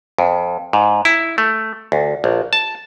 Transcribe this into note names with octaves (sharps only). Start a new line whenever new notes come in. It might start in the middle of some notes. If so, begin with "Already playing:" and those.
F2
G#2
E4
A3
D2
A#1
A5